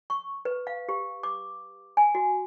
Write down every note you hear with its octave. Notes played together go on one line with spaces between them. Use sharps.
C#6
B4
F5
G4
D6
G#5
F#4